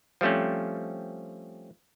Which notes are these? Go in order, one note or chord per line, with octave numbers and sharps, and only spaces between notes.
F3 G3 A3 C4 C#4